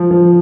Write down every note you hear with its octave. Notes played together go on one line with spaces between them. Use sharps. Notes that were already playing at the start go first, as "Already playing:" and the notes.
Already playing: F3
F3